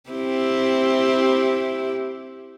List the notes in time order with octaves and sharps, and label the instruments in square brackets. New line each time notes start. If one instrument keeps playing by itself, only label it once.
[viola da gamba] C4 E4 G4